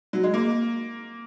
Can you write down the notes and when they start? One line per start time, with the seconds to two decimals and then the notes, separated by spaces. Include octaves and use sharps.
0.13 F#3
0.23 G#3
0.34 A#3